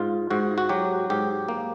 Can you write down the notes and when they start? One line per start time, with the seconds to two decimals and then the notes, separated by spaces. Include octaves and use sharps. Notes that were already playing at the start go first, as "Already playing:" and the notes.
Already playing: G#2 F4
0.30 G#2 F#4
0.58 F#4
0.69 F#3 G4
1.10 G#2 G4
1.49 A#3